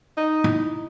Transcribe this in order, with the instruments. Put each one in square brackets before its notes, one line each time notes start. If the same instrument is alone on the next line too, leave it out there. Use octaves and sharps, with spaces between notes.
[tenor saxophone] D#4
[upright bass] E4